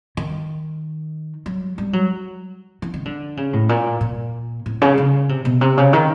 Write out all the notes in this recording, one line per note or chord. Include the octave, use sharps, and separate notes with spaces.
D#3
F#3
G3
F#3
E3
D#3
D3
C#3
A2
A#2
A#2
A2
C#3
C#3
C3
B2
C3
C#3
D#3